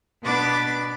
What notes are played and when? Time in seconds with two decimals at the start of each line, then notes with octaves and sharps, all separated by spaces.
0.23 B2 B3 D4 B4 D6 A6